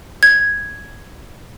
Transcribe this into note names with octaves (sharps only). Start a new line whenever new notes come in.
G#6